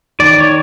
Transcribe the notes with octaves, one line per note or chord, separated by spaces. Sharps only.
D#3 D5
C#5